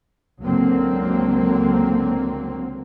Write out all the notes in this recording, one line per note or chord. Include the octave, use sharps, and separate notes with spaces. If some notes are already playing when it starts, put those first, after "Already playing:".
C#2 D3 F#3 A#3 C4